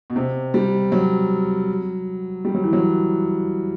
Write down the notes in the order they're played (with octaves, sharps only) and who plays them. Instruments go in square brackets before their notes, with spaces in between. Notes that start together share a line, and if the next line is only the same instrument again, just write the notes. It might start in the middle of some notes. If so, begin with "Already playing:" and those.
[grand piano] B2
C3
G3
F#3
G3
F#3
E3
F#3